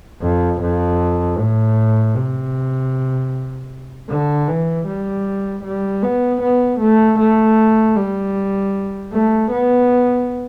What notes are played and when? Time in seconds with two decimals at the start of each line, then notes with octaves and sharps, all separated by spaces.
0.22 F2
0.61 F2
1.38 A2
2.16 C3
4.09 D3
4.48 E3
4.87 G3
5.64 G3
6.03 B3
6.42 B3
6.80 A3
7.19 A3
7.96 G3
9.12 A3
9.51 B3